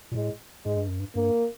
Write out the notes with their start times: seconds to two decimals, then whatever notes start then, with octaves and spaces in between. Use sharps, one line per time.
0.11 A#2
0.15 A2 G#3
0.66 G#2 G#3
0.76 G2
0.88 F#2
1.00 G2
1.15 G2 A#3